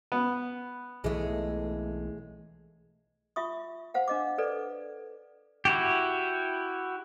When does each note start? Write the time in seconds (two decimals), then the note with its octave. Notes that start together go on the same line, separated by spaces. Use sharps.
0.12 B3
1.04 B1 E3 G#3 A3
3.36 F4 E5 C#6 D#6
3.94 C5 F5 F#5
4.08 D4 D#5 D6
4.38 A4 B4 D5
5.65 E4 F#4 G4